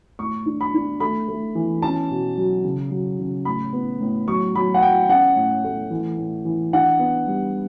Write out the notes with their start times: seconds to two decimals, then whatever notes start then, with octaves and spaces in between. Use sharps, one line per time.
0.19 A2 C#6
0.46 D4
0.61 B5
0.74 D4
1.00 A3 B5
1.28 A3
1.55 E3
1.82 C#4 A5
2.10 B2
2.37 F#3
2.64 C#3
2.91 F#3
3.19 C#3
3.45 A2 B5
3.73 B3
4.01 A2
4.28 F#3 C#6
4.55 F#3 B5
4.74 F#5
4.82 F#3 G5
5.09 C#4 F#5
5.36 A2
5.64 A3
5.90 E3
6.18 A2
6.45 E3
6.73 D4 F#5
6.99 B3
7.27 G3